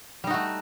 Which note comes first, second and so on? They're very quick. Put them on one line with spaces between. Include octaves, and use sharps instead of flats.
G3 D#4 F#4 A3